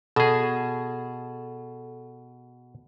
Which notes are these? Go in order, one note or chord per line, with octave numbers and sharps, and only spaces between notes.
B2 G#4 A4